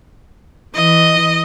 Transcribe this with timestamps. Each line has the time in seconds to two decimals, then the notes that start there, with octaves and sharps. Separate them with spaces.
0.75 E3 D#5